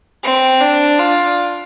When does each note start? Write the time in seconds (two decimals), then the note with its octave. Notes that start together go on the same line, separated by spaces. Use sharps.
0.23 C4
0.61 D4
0.99 F4